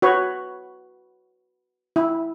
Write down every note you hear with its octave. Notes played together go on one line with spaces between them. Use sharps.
F#4 B4 C#5
E4